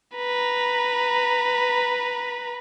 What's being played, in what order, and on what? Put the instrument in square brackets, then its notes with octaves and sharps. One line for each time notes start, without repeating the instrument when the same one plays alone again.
[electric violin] B4 A#5